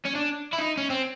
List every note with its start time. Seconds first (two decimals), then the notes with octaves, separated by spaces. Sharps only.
0.05 C#4
0.15 D4
0.53 E4
0.58 D#4
0.77 C#4
0.90 C4